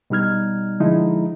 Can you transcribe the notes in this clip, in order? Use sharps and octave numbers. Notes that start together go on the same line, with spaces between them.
B2 G3 D#4 F6 G#6
D3 F3 G#3 D#4 E4